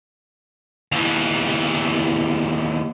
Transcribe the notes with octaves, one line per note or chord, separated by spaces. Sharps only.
D#2 E3